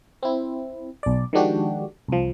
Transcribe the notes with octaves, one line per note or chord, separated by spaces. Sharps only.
C4 E4
B1 D5
D#3 F3 G#3 D4 F#4 G4
C2 F3